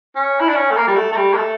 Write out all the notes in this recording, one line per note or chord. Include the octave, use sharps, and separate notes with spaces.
C#4
E4
D4
C#4
A3
A#3
G3
A3
A3
G3
A#3
A3